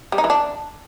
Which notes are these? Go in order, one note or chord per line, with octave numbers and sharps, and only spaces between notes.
G3
D#4
E3
D4